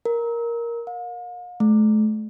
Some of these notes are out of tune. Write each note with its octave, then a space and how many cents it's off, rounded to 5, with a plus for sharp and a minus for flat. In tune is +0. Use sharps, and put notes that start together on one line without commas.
A#4 +5
F5 +45
A3 -40